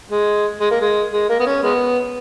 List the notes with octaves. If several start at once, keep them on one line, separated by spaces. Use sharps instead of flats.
G#3
G#3
A#3
G#3
G#3
A#3
B3
C#4
G#3 B3